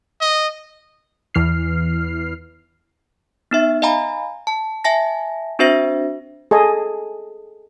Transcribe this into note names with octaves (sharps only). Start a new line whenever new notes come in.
D#5
E2 E3 F6 C7
B3 D#4 E5
D#5 F5 G#5 A#5 B5
A5
E5 G#5 A5 A#6
C4 D4 F#4 C5 E5 A#6
G#4 A4 D#5 G#5